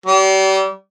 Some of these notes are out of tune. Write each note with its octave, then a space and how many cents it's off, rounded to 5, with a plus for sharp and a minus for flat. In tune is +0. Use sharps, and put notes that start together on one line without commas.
G3 -35